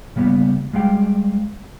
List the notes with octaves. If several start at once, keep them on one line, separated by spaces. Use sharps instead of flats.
C#3 G3 A#3 B3
G3 G#3 F5 G5